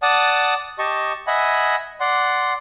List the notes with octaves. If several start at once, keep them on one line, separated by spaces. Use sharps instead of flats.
D5 F#5 A5 D#6
G4 D#5 A5 C#6
D#5 E5 F#5 G#5 B5
D5 F#5 C6